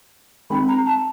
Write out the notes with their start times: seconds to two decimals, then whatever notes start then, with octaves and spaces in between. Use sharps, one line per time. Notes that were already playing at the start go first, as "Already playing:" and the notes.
0.50 D#3 G#3 C4 B5
0.68 A#5
0.86 A5